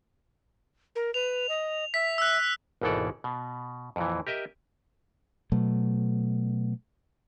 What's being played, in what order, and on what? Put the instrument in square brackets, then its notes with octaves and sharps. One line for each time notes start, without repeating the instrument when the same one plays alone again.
[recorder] A#4
[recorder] B4 [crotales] F7
[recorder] D#5
[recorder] E5 [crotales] B6
[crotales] E6 F#6
[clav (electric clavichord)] G#1 D#2 B2 E3 A4 D5
B2
F2 A#2 E3
G4 A#4 D#5 E5
[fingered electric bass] B2 F#3 A3